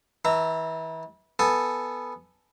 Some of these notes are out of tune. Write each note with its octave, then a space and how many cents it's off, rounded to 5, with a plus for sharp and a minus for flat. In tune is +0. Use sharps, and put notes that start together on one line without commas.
E3 -30 E5 +0 A#5 -30
B3 +0 A4 +0 G#5 +0